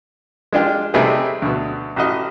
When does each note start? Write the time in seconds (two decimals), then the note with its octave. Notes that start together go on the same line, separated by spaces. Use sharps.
0.53 G#3 D4 F4 G4
0.94 C3 G3 A3 C4 D#4 G#4
1.42 D2 B2
1.96 A1 F#4 D#5